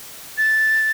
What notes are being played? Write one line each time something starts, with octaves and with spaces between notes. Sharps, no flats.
A6